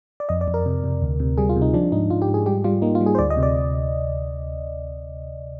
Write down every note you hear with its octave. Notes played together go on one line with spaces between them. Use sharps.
D5
F2 D#5
D5
F2
A#4
C3
C3
D2
C3
G3 G#4
F4
C3
D#4
F3 D4
G#2 D#4
G#2 F4
G4
G#2
G#4
G3 G4
G3 F4
A#3 D#4
F4
G3
G#4
C5
D2 D5
D#5
C3
D5